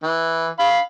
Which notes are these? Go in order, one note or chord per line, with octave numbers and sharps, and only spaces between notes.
E3
F5 B5